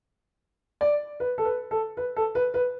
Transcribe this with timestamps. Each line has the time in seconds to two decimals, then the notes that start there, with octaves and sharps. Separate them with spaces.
0.81 D5
1.20 B4
1.38 A4
1.45 B4
1.71 A4
1.97 B4
2.16 A4
2.35 B4
2.54 B4